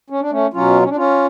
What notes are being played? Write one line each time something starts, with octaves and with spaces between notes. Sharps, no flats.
C#4
D4
A3 C#4
B2 F#3 C#4 F4
C#4
D4
C#4 F4